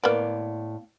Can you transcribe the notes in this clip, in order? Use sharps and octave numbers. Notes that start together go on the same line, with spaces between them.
A2 A#3 B3 D5